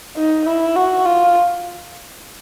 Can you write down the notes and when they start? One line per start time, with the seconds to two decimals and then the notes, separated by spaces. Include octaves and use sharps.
0.17 D#4
0.46 E4
0.76 F#4
1.05 F4